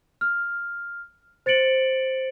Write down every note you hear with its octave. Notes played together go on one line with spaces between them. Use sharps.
F6
C5 A6 C#7 D7 F#7